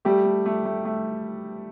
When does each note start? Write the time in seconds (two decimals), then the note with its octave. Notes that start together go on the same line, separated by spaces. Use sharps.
0.05 G3 A3 G4
0.25 A3
0.46 A3
0.65 A3
0.85 A3